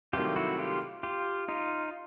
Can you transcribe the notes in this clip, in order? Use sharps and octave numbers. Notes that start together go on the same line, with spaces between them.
C2 C3 D#3 F#3 A3 F4 G4
E4 F#4
F4 G4
F4 G4
D#4 F4